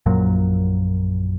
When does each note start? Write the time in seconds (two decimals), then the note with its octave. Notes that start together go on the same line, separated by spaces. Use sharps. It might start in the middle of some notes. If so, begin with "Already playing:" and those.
0.06 A#1 F#2 A#2 F#3